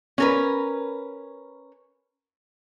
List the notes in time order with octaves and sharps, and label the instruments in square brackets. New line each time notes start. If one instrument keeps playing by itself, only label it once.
[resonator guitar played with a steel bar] C#4 A#4 B4